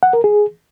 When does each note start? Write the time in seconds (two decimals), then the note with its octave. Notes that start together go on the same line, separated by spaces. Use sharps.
0.03 F#5
0.13 A#4
0.24 G#4